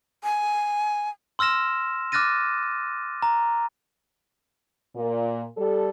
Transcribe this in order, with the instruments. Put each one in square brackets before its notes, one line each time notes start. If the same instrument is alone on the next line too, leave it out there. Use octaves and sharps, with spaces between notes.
[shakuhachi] G#5
[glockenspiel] C6 E6 F6 A#6 E7
D6 F6 F#6 A6 A#6 D#7
A#5
[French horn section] A#2
G3 A4